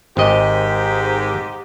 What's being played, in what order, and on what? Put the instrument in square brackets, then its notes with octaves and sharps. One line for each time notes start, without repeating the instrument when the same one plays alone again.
[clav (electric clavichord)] G#1 D#5 [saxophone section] G#2 G4